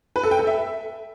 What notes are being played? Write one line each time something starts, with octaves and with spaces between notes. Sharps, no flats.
B4
A4
G5
A4
E5